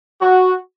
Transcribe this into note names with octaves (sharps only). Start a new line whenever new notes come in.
F#4